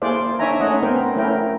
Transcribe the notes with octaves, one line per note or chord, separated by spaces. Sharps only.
A#3 E4 G#4 C5 D5 F5
D4 D#4 C#5 E5 G#5 A#5
A3 C#4 D#4 D#5 F#5
B3 C4 A#4 C5 G5
A3 C#4 E4 A#4 G5